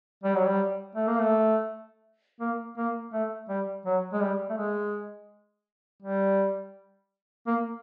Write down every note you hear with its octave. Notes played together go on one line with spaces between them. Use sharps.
G3
F#3
G3
A3
A#3
A3
A#3
A#3
A3
G3
F#3
G#3
G3
A3
G#3
G3
A#3